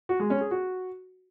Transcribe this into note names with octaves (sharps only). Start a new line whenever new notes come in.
F#4
G#3
C#4
G#4
F#4